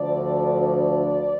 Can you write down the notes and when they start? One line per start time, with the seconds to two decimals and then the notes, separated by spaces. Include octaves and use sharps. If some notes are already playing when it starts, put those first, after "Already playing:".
Already playing: D2 D3 F3 D5
0.57 D5